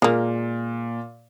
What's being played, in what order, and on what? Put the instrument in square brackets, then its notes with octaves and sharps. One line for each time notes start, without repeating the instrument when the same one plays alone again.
[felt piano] A#2 [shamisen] G#3 A#3